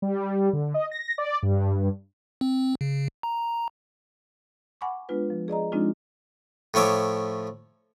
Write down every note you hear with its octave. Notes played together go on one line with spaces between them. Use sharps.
G3
D3
D#5
A#6
D5
G2
C4
C#3
A#5
F#5 G#5 B5 C#6 D6
G#3 B3 D4 F4 B4
F3
G#4 D5 D#5 A#5
F3 G#3 C4 D4 D#4 F4
A2 F3 C#5 E5 D6